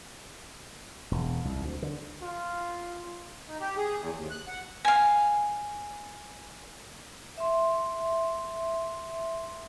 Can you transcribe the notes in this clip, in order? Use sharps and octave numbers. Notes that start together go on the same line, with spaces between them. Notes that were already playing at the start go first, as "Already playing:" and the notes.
E1
C2
D2
D3
F4
D#4
G4
G#4
E2
D#2
F#6
F#5
F5 G#5
E5 C6